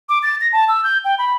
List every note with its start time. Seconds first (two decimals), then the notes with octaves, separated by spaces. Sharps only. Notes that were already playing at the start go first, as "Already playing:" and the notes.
0.09 D6
0.23 A6
0.41 A#6
0.53 A5
0.68 E6
0.84 G6
1.05 G5
1.18 B5